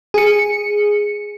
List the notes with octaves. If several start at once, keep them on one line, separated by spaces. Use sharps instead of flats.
G#4 C#7